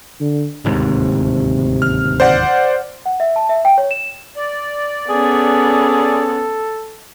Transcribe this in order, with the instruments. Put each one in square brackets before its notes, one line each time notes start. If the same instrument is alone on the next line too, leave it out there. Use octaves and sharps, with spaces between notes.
[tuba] D3
[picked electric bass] D1 D#2 G#2 [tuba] C3
[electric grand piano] F6
C5 D5 F#5
[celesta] F#5
E5
A5
E5
G5
C#5
E7
[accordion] D5
[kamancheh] B3 C#4 [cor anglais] G#4 [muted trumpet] A4